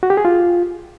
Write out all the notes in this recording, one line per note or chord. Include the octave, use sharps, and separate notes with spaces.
F#4
G4
G#4
F4